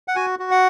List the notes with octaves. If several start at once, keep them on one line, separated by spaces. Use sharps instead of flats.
F#5
F#4 G#5
F#4
F#5